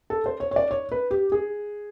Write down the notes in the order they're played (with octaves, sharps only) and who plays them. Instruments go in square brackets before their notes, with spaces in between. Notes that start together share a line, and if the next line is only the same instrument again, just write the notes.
[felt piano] A4
C5
C#5
C#5
D5
C#5
B4
G4
G#4